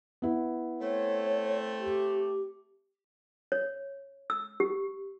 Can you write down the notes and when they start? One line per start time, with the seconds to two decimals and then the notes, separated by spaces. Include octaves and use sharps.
0.22 B3 E4
0.80 A3 C4 C#5
1.79 G4
3.52 C#5
4.30 E6
4.60 G4